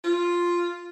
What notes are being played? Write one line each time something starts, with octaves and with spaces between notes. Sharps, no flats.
F4